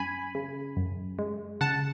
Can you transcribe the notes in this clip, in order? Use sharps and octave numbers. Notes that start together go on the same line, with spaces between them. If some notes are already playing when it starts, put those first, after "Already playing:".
Already playing: F#2 G#5 B5
C#3
F#2
G#3
C#3 F#5 A5